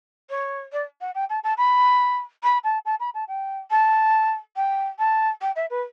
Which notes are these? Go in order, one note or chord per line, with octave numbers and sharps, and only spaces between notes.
C#5
D5
F#5
G5
A5
A5
B5
B5
A5
A5
B5
A5
G5
A5
G5
A5
G5
E5
B4